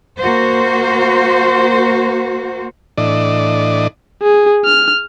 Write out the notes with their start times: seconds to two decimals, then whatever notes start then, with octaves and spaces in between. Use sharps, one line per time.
0.20 A#3 F#4 C5
2.98 A2 E3 D4 D5 D#5
4.22 G#4
4.65 F6